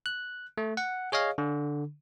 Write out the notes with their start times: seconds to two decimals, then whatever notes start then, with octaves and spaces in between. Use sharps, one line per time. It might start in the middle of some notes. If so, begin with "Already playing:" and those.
0.06 F#6
0.58 A3
0.77 F#5
1.12 G#4 C#5 D#5 F5
1.38 D3